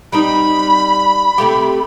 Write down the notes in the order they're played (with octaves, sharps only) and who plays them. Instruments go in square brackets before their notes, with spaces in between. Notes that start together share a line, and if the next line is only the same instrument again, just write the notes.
[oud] G3 C4 D#4 [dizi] B5
[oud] C3 A3 G4